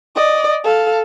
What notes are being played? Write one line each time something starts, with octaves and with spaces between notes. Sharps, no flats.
D5 D#5
A4 F5